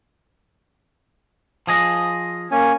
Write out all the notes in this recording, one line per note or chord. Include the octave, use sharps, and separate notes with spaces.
F3 G#4 D#5
A#3 C#4 G#5